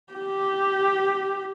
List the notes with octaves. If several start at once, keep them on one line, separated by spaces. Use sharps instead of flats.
G4